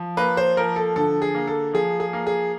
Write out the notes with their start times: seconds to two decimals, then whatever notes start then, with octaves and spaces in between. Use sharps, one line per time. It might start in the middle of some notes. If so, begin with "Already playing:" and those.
Already playing: F3
0.17 A#3 B4
0.37 C5
0.57 F3 A#4
0.76 A4
0.96 D3 A4
1.22 G#4
1.35 A#3
1.47 A4
1.73 F3 G#4
2.00 G#4
2.13 A#3
2.27 G#4